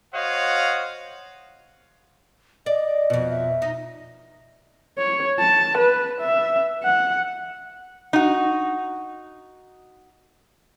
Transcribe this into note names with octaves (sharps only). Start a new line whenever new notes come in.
F#4 C5 C#5 D#5 F5 F#5
D5 D#5
F2 B2
E5
D#4
C#5
A5
B4
E5
F#5
D#4 F#4